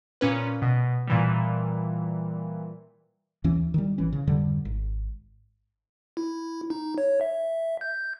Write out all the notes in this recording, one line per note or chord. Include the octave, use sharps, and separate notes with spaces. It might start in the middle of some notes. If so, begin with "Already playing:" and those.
A#2 C#4 B4
B2
A#2 E3 G3
D#2 E3 C#4
D#3 G3
G#1 E3 C#4
C#3
F2 G#2 D3 G3
G#1
E4
D#4
C#5
E5
G6